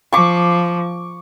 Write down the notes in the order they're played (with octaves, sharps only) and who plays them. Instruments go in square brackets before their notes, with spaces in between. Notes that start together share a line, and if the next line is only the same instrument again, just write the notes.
[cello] F3 [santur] C#6 D6